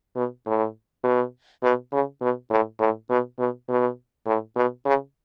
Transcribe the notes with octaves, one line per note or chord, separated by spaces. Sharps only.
B2
A2
B2
B2
C#3
B2
A2
A2
B2
B2
B2
A2
B2
C#3